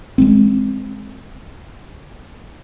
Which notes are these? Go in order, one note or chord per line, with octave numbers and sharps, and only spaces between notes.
G#3 B3 C4